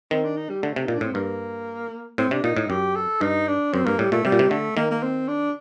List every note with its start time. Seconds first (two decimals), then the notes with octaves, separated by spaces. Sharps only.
0.11 D#3 C4
0.24 D4
0.36 D#4
0.50 G3
0.63 D3 A3
0.76 C3
0.85 A#2 D#4
0.94 D4
1.01 A2 C4
1.14 G2 A#3
2.18 A2 C4
2.31 C3 D4
2.44 A#2 D#4
2.56 A2
2.69 F#2 G4
2.96 A4
3.21 G2 D#4
3.48 D4
3.73 F#2 C4
3.86 G2 A#3
3.98 A2 G3
4.12 A#2 A3
4.25 C3 G3
4.32 A#2
4.39 C3
4.50 D3 A3
4.77 D#3 A#3
4.91 A#3
5.03 C4
5.28 D4